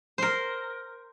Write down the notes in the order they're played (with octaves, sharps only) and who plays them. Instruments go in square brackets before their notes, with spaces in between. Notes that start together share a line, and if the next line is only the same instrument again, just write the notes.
[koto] A#4 C5